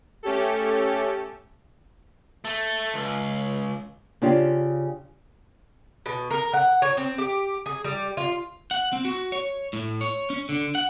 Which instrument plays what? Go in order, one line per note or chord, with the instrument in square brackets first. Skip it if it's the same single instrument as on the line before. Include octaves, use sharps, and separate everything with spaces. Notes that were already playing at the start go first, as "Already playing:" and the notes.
[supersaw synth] A3 C#4 G4 A4
[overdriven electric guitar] A3
C#2
[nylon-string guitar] C#3 C#4 D4 F4 G4
[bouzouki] B2
A#4
F#5
C#5
C4
G4
G#4
G3
F4
[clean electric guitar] F#5
C4
F#4
C#5
A2
C#5
C#4
D3
F#5